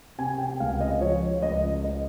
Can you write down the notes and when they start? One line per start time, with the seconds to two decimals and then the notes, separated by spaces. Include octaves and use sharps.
0.18 C3 G#5
0.38 G5
0.60 C#2 F5
0.80 D#5
1.01 F3 C#5
1.42 C#2 D#5
1.84 D#5